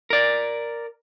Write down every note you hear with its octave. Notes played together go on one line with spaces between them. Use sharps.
A#4 D5